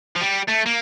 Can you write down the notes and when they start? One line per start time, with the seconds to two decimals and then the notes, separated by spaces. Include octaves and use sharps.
0.16 F3
0.21 G3
0.48 A3
0.66 A#3